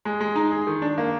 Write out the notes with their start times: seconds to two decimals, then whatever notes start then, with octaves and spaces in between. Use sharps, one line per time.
0.05 G#3
0.21 G#3
0.35 D#4
0.51 G#4
0.67 D#3
0.82 D4
0.98 A#3